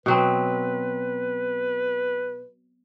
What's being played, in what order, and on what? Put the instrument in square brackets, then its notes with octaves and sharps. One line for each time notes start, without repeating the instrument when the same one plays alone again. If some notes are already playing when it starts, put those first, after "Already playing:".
[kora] B2 F#3 C4 [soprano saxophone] B4